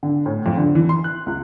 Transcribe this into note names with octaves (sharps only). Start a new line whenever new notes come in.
D3
A2
F2
D3
E3
C6
F#6
C#2